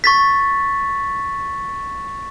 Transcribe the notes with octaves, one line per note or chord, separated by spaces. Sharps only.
C#6 A6 B6